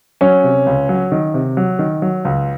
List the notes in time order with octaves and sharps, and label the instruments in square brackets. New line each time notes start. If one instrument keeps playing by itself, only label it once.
[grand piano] F#3 [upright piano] C#4
[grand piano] C3
C#2
F#3
D#3
C3
F#3
D#3
F#3
C#2